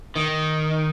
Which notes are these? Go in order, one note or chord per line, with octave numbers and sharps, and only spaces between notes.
D#3